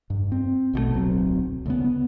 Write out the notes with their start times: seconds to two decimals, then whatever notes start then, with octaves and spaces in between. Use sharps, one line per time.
0.10 G2
0.32 C4
0.73 A#1 B2 D3 A3
0.93 D1 B1 F#3 C4
1.66 D2 C#3 B3
1.84 B3